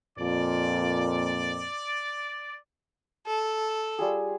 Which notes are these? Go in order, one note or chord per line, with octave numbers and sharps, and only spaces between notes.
F2 A#2 D5
A4
G3 F4 G#4